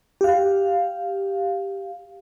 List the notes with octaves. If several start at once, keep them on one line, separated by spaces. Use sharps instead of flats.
G4 F5